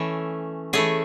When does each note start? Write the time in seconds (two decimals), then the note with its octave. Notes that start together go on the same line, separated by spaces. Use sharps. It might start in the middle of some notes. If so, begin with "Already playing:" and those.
Already playing: E3 A3 C#4
0.73 E3 A3 C#4 G#4